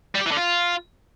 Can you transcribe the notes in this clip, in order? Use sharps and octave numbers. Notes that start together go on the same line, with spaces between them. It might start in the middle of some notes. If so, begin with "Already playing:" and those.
G3
G4
E3
D3
F4